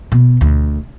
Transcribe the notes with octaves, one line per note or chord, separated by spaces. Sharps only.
B2
D2